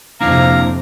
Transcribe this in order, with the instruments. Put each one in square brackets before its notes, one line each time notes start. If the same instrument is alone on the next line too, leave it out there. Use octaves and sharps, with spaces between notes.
[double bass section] F2 C3 [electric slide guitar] A#3 D4 E4 [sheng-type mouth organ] F5 A#5